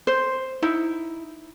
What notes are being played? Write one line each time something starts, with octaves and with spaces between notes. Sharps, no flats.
C5
D#4 E4